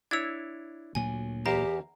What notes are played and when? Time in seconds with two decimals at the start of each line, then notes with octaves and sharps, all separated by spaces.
0.11 D4 E4 C#5 E6 G#6
0.95 D2 A#2 F#3 G#5
1.46 E2 G4 A#4 C5 A#5